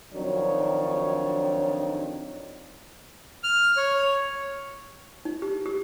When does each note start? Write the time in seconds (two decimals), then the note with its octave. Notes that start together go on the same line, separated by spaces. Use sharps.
0.13 F2 D#3 F#3 D4 D#4 C#5
3.44 F6
3.77 C#5
5.25 D#4
5.42 G4
5.66 G4